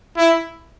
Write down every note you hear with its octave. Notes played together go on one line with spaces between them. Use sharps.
E4